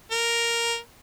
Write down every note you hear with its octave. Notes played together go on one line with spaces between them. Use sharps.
A#4